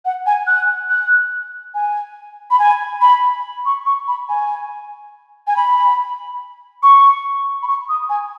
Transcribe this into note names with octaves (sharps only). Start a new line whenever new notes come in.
F#5
G#5
F#6
F#6
G#5
B5
G#5
B5
C#6
C#6
B5
G#5
G#5
B5
C#6
B5
C#6
D#6
G#5